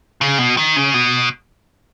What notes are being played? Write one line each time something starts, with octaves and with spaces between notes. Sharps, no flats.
C#3
B2
D#3
C#3
B2